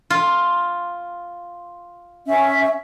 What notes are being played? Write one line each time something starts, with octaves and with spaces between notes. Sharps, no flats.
F4
C#4 E5